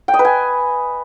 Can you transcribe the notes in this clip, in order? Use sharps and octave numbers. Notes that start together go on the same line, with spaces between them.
G5
D#5
B4
G#5